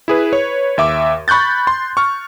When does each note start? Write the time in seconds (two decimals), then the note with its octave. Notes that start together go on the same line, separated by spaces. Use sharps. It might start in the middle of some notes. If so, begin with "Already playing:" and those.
0.08 E4 G#4 B4
0.33 B4 C#5
0.78 D#2 E5 D6
1.28 B5 C#6 F#6 G6 A6
1.67 C6
1.97 C#6 F6